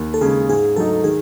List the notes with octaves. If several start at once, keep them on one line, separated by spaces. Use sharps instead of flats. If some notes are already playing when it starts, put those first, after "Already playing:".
Already playing: D#2
A4
C#3 G#3 G#4
G#2 G#4
F#3 A3 D#4 A4
D#3 G#4